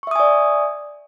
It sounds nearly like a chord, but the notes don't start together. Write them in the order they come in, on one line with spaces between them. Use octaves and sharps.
C#6 E5 D#6 G#5 D5